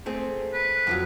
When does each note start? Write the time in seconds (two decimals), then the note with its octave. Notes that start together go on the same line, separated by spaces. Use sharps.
0.06 A3 C4 G#4
0.54 B4
0.87 F2 F3 F#3